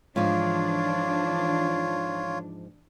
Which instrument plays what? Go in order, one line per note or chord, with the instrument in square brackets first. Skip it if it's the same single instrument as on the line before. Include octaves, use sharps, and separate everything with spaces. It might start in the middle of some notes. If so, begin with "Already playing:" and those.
[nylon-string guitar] G#2 F3 [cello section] E3 D4 [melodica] F4 C#5